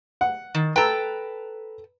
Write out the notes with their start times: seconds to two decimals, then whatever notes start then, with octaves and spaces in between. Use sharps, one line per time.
0.21 F#5
0.55 D#3
0.76 A4 B4 G5 A#5